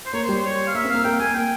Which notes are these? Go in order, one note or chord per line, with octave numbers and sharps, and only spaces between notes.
C5
A#3 C#5
C5
G3
C5
C#5
F5
A#3 E5
C4
A#3 F5
A#3 G5
A#3 G#5
A#3 G5